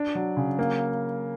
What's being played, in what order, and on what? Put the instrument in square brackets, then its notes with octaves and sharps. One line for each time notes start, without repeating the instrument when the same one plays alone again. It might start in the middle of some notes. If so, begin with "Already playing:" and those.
Already playing: [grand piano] D4
F#3
C#3
A#3